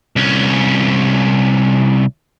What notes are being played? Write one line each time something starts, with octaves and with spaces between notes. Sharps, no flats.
C2 C#4